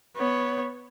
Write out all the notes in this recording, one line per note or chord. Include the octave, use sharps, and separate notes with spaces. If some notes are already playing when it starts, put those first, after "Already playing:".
B3 C#5